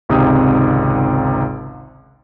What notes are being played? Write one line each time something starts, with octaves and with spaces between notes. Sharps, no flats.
G#1 C#2 C3 D#4 D#6